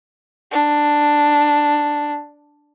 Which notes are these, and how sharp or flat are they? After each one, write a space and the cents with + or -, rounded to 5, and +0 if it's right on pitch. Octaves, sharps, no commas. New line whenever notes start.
D4 +5